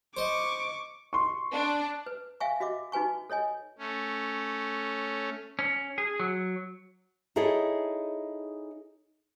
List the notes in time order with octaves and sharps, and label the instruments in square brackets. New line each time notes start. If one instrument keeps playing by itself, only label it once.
[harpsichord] C5 D#5 [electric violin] C#6 D6
[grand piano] C6 C#6
[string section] D4
[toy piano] B4
E5 F5 G5 G#5 C#6
F#4 D#5 E5 D6
D#4 F#4 B4 G#5 C#6
A4 C#5 D#5 G#5
[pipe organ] A3 C#4
[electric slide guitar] C#4
G#4
F#3
[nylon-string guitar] D#4 E4 G#4 A4 C#5 D#5